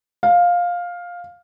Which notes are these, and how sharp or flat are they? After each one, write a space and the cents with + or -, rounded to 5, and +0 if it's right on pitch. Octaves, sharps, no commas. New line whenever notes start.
F5 +10